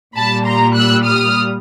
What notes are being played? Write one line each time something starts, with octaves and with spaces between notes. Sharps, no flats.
A#2 G3 A5 B5
A#5 C6
E6 F#6
D#6 F6